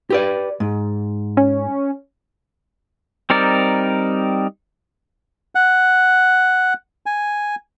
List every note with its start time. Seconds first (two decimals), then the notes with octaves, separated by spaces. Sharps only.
0.10 G4 B4 D5
0.60 G#2
1.37 C#4
3.30 G3 C4 D#4 A#4 D5
5.55 F#5
7.06 G#5